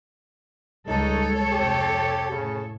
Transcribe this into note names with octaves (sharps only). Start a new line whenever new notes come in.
C#2 G3 G#3 D#4 A4 C#5
F2 C3 G4
A2 C#3